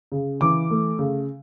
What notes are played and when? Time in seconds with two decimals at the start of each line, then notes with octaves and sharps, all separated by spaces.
0.12 C#3
0.41 E3 D6
0.71 A3
0.99 C#3